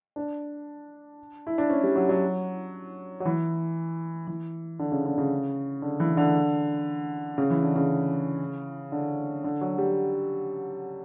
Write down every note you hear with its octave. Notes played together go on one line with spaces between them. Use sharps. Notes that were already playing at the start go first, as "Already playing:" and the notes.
D4
E4
D4
C#4
G3
F#3
F#3
F#3
E3
E3
D3
C#3
D3
C#3
D3
E3
D3
C#3
E3
D3
C#3
D3
D3
F#3
G3